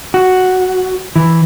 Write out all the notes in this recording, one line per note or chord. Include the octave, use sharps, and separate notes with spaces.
F#4
E3